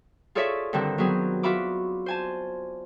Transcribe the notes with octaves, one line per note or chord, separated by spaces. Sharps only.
F4 G#4 A4 C#5 D5 E5
G2 D3 D#3 C4
F#3 B3 C4 G#4
F4 F#4 E5 B5 D6
C5 G#5 A5